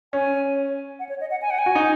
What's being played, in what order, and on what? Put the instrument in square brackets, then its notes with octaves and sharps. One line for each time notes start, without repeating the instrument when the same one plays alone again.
[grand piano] C#4 [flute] G#5
[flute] F#5
C#5
D#5
F#5
G#5
F#5
G#5
[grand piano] F#4
D#4